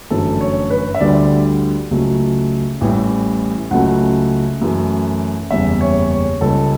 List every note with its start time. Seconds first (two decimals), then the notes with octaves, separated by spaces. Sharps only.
0.10 G1 F#2 E3 A3 A4
0.41 C#5
0.70 B4
0.95 E5
1.00 D2 D3 G3 D5
1.91 C#2 C#3 F#3 A3
2.81 A1 A2 E3 G3
3.71 C#2 C#3 F#3 A3 F#5
4.61 F#2 E3 A3
5.51 F#1 E2 C#3 G3 E5
5.81 C#5
6.11 C#5
6.41 C#2 C#3 G3 A4